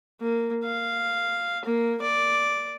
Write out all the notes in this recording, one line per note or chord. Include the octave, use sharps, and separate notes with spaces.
A#3
F5
A#3
D5